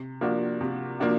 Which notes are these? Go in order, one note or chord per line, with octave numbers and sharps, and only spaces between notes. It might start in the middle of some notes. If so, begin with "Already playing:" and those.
Already playing: C3
F3 A#3 D4 F#4
C3
F3 A#3 D4 F#4